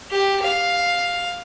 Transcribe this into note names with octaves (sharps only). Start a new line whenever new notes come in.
G4
F5